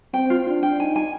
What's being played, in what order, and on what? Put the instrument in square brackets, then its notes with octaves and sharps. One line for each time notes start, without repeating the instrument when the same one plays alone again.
[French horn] C4 [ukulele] G5
[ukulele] F4
[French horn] D4 [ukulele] F4
[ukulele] G5
[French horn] D#4 [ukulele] G#5
[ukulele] G#5